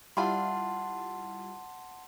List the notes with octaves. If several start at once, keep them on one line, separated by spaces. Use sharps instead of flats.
G3 E4 F4 F#5 A5 C6